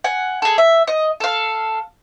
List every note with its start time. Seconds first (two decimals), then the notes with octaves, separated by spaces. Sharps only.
0.04 F#5 G#5
0.42 G#4 A4
0.58 E5
0.87 D#5
1.20 A4 F5